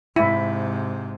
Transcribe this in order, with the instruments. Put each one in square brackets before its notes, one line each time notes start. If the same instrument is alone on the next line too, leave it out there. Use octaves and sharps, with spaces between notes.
[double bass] G#2 C3 [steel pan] E4